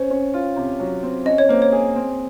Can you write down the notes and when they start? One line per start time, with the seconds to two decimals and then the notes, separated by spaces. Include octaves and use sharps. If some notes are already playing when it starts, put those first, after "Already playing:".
Already playing: C#4 C5
0.10 C#4
0.34 F4
0.56 C3
0.80 F#3
1.03 C4
1.25 C#4 D#5
1.38 C#5
1.49 A#3 C5
1.62 C#5
1.72 G#4
1.96 C4